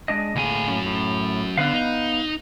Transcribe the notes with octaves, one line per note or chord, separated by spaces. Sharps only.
G#3 D4 D#5
D2 A2 A#3 G#4 G#5
F#3 C#4
A2
D3 B3 B4 F5
D#4